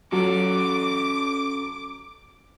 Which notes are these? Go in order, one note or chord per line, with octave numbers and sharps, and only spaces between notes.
F#3 C#4 A4 D6